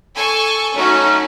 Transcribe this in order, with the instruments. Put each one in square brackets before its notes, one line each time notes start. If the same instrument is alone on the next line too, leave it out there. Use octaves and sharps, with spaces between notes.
[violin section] A4 G#5 C#6
[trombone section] F#3 C#4 [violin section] A3 D#4 F#4